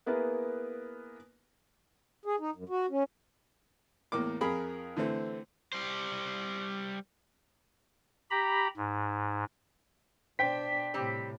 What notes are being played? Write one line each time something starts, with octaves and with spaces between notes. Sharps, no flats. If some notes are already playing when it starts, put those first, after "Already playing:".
A#3 B3 E4 G#4 A#4 B4
G#4
D#4
F#2
F#4
C#4
E2 A2 A#3 D6
F2 G#4 A#4 B5
D3 E3 A3 C4
G3 C5
G4 A#5 B5
G#2
B2 D4 C5 G5 B6
A2 C3 G3 C4 G4